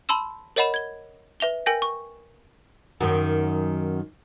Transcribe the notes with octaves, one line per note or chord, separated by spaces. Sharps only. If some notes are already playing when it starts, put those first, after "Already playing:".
A5 B5 C6 E6 E7
A#4 C#5 D#5 F#5 B5 E7
G#6 G7
B4 E5 F7 G7
A#4 G5 G#5 G6 A#6
C#6
F#2 D#3